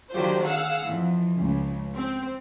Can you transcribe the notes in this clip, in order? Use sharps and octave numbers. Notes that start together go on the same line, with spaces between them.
D3 D#3 F#3 F4 G4 C5
G#4 F5 F#5 E6
F2 E3
C#2
C4